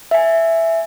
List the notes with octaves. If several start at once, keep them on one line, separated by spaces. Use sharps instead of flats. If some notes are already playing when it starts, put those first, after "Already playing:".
E5 G#5